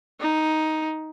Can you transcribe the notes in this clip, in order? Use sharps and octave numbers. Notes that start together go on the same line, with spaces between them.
D#4